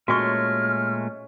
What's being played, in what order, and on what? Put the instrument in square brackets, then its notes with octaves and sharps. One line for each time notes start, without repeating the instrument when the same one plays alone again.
[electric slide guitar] A#2 G#3 A3 [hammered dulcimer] C#4 [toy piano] F#4 G#5 C#6 [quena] F6